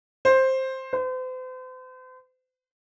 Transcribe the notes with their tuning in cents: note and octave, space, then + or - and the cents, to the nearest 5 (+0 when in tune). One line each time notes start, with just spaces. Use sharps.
C5 +10
C5 -40